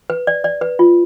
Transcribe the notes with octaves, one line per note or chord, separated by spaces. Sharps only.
B4
D5
D5
B4
F4